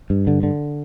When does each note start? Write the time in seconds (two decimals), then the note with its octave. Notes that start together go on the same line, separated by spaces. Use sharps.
0.10 G2
0.27 D3
0.43 D3